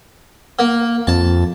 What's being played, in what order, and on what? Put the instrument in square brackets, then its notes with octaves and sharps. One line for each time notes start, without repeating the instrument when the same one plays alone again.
[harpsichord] A#3
[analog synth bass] F2 [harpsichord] A5